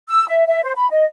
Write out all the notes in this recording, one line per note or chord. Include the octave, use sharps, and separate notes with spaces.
E6
E5
E5
C5
B5
D#5